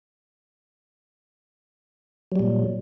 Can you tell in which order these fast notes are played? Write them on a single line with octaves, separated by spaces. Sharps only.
F#3 G3 A#2